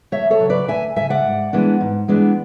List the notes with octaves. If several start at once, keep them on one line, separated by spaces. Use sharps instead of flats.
D2 C#5 E5
A4 C#5
C#3 F#3
B4 D5
D2 E5 G#5
C#3 F#3 E5 G#5
D5 F#5
G#2
E3 G#3 B3 D4
G#2
E3 G#3 B3 D4